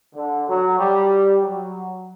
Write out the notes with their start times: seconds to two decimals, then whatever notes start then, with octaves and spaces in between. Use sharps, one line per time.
0.15 D3
0.48 F#3
0.79 G3
1.42 F#3